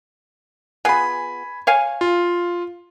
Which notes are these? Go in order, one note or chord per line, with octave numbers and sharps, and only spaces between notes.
B3 F4 G#4 G#5 B5
C#5 F5 G#5
F4